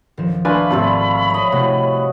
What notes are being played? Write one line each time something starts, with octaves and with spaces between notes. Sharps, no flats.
D#1 F3 E7
A3 D4 F4 A4 B4 G#5 B5
G#1 C3 A3 F4 D5 A5 A6
G3 C#5 D#5
A2 C3 F#4